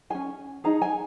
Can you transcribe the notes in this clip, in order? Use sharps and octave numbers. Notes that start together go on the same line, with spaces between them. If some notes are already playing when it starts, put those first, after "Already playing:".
C#4 G#4 G#5
D#4 G#4 A#5
G#5